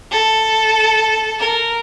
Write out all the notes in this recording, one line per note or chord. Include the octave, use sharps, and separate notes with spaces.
A4
A#4